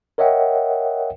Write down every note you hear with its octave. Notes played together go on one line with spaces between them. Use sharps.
A#4 C#5 D#5 E5 F#5 G5